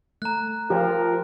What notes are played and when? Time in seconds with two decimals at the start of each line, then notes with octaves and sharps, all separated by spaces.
0.22 A3 A#5 F#6
0.70 F3 G4 A#4